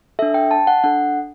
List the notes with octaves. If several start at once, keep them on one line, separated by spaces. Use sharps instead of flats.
D4 A4 E5
G5
A5
F#5
D4 A4 F#5